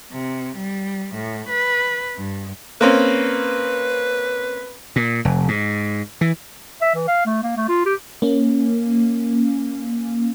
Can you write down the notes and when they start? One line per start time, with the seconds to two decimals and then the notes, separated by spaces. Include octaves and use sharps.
0.12 C3
0.57 G3
1.15 A2
1.49 B4
2.17 G2
2.81 A#3 C4 C#4 B4
4.96 A#2
5.25 F1
5.48 G#2
6.21 E3
6.81 E5
6.95 E3
7.08 F5
7.26 A3
7.43 A#3
7.57 A3
7.69 F4
7.86 G4
8.22 A#3 C#4